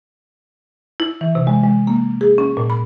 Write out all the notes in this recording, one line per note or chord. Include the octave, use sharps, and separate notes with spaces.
E4
E3
C3
G#3
G#3
A#3
G#4
C#4
A#2
B5